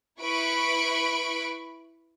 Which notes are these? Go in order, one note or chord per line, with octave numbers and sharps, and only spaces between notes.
E4 B4 B5 C#6 D7